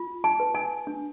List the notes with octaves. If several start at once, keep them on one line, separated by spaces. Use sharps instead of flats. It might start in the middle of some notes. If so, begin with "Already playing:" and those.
Already playing: F4
A5
B4
G#5
D4